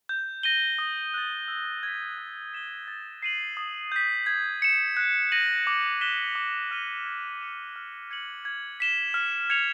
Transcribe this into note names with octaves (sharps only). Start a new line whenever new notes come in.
G6
A#6 D#7 G7
D#6
F#6 A6
E6
G#6 B6
F#6
B6 E7 G7
A6
C7 D#7 F#7
D#6
G6 B6
G#6
C#7 E7
F#6
A#6 D#7 F#7
D6
F#6 B6 E7 G7
D6
F6 A#6 D#7 G7
G#6
C#7 E7
F6
G#6 C#7 F#7
G#6
B6 E7 G7
F6
G#6 C#7 F7